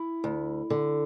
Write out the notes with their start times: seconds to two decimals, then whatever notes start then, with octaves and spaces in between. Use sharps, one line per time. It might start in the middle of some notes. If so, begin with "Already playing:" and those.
Already playing: E4
0.24 D2
0.70 D3